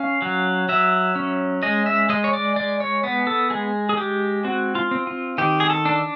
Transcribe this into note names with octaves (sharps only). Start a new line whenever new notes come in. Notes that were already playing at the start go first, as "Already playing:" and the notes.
Already playing: C#4 F5
F#3
F#3 E5
C#4
G#3 D#5
E5
G#3 D#5
C#5
D5
G#3 D5
C#5
B3
A4
G#3 G#4
G#4
G#3 G4
C4 F#4
F4
C4
F4
D#3 G4
G#4
A4
D4